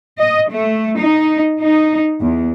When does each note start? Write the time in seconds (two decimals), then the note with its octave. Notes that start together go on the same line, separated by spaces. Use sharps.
0.19 D#5
0.50 A3
0.98 D#4
1.60 D#4
2.19 E2